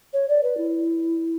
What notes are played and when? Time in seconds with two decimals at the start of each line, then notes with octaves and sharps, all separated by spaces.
0.13 C#5
0.29 D5
0.43 B4
0.57 E4